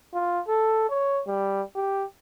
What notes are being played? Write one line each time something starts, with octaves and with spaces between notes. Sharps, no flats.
F4
A4
C#5
G3
G4